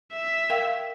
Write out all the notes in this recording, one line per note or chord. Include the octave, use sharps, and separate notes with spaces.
E5
A#4 F5 G5